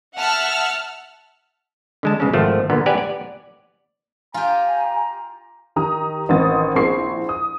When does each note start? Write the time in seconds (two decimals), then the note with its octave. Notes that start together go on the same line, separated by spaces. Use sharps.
0.17 E5 F#5 A5 E6 F6
2.03 D3 G#3 A5
2.20 B1 C#3 G#3 C#4
2.33 G#1 F3 A3
2.70 A#2 D3 B3
2.86 G4 B4 D5 F#5 G#5
2.98 D5
4.34 F4 G4 G#5 A#5
5.76 D#3 G4 A#5 D#6
6.29 A1 D#3 C4 D#6 A6
6.75 A#1 C4 E4 G#4 C#6 C7
7.29 D#6